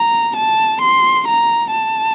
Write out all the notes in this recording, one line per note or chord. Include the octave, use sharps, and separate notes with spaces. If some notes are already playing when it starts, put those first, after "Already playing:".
Already playing: A#5
A5
C6
A#5
A5